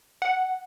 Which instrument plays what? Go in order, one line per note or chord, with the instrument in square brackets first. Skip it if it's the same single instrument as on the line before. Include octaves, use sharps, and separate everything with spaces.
[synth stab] F#5